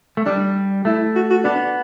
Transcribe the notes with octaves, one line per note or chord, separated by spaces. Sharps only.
A3
G3 D4
A3 E4
F#4
F#4
B3 D4